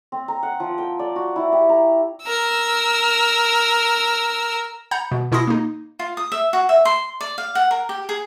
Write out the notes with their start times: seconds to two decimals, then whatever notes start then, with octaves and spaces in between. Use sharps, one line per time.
0.12 C4
0.28 A#5
0.43 F#5
0.60 F3
0.78 G5
0.99 D5
1.16 F#4
1.36 E4
1.52 G4
1.69 A#5
2.22 A#4 E6
4.91 F#5 A#5 B5 G6
5.11 B2
5.32 B2 E4 C6 D#6 A#6
5.47 A#3 D#4
5.99 F4
6.17 D#6
6.32 E5
6.53 F#4
6.69 E5
6.85 C6
7.21 D5
7.38 F5
7.55 F#5
7.71 A#4
7.89 G4
8.09 G#4